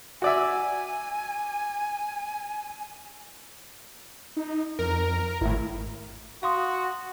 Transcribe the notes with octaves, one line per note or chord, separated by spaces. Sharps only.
F#4 D5 E5 G#5
D#4
F2 A#4
G#1 A2 E4
F#4 F5 C6 D#6